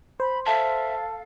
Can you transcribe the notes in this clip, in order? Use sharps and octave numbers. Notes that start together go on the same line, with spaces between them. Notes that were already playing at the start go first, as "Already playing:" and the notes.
C5 B5
A4 E5 F5 A5